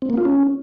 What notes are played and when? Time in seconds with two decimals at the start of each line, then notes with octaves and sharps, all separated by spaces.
0.02 C4
0.10 A#3
0.17 F4
0.25 C#4